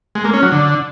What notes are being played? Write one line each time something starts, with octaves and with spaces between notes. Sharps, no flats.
G#3
A#3
C#4
F#3
D3